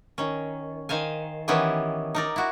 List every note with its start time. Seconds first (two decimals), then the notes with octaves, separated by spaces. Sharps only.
0.18 D#3 C#4
0.89 D#3 C5 F5 G#5
1.48 D#3 E3 B3 C#4 E4 G4
2.15 D#4 A#4 D5
2.36 E4 F#4